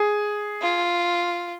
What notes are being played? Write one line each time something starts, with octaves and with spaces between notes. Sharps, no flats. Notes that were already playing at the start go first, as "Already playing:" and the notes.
Already playing: G#4
F4